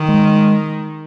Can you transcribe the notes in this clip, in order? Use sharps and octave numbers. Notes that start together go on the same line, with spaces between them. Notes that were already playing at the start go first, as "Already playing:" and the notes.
Already playing: D#3
G#3